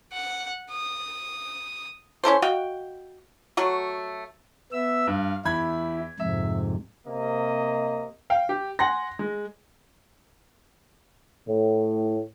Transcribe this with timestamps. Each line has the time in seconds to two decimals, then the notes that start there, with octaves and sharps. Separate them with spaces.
0.12 F#5
0.71 D#6
2.24 C#4 E4 A4 C5
2.42 F#4 D#5 F5 G5
3.57 F#3 A3 F#4
4.72 B3 E5 E6
5.07 G2 F5
5.45 E2 E4 B5 G#6
6.20 F2 G#2 C3 E5
7.07 C3 A#3 D#5
8.30 F5 G5
8.49 G4
8.79 F#5 G#5 C6 A#6
9.19 G#3
11.48 A2